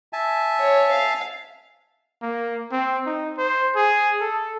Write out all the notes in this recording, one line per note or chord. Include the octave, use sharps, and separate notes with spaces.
E5 G#5 A5
C#5
F5
A#3
C4
D#4
C5
G#4
A4